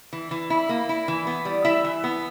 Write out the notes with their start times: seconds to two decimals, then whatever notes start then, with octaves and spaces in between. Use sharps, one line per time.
0.13 E3
0.31 E3
0.50 E4
0.69 A#3
0.89 E4
1.08 E3
1.27 B3
1.45 G3
1.65 E4 E5
1.84 E3
2.04 B3